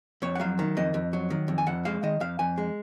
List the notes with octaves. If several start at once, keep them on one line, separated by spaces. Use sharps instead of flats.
F2 C#5
F#5
F#3 F5
D#3
F2 D#5
F2
F#3
D#3
F2
G#5
F2 F#5
G#3 F5
D#3 D#5
F2 F5
F2 G#5
G#3